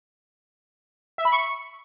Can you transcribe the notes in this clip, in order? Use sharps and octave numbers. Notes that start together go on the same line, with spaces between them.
E5
B5
C#6